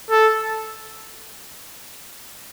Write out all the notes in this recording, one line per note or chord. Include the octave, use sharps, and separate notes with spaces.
A4